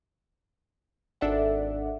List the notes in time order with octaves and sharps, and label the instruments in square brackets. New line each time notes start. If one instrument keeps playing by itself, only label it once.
[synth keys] G#1 D4 A4 D5 E5 F#5